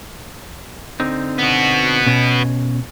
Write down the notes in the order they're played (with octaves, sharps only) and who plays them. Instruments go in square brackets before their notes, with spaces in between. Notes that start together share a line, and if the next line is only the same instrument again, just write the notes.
[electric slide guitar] D3 C4 D#4
[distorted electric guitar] B3 F#4
[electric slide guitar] B2 C#4